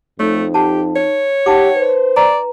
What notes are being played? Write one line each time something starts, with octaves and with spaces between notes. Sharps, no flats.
F2 A3 D#4 C#5
G4 F#5 A5
C#5
D#4 G4 F#5 G5 A5 D6
B4 C5
D5 A#5